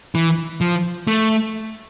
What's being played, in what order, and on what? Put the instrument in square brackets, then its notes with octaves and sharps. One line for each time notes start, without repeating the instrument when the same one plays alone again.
[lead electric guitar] E3
F3
A3